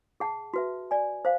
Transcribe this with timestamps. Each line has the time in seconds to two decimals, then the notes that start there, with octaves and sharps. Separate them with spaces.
0.20 G#4 F#5 A5
0.54 F#4 B4 E5
0.91 D5 G#5
1.25 C5 F5